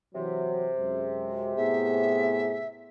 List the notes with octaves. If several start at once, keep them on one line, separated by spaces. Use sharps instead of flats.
C3 E3 F#3
F#2 G#3
A2 B3 G#4 E5